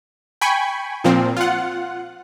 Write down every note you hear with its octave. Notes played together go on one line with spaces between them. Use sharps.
G5 G#5 B5 C#6
A#2 F3 C4
F4 F#5